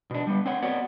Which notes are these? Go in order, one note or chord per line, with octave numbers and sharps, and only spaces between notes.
B2 D4
G3 B3
C4 C#5 F#5
B3 F#4 C#5 D5 F#5